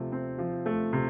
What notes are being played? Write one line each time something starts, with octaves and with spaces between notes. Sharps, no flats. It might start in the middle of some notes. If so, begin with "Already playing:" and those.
Already playing: C3 F3 A3
C4
F3
A3
C3